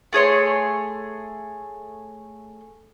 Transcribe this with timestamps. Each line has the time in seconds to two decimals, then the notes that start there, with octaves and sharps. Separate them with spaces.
0.13 A3 G#4 C#5 C6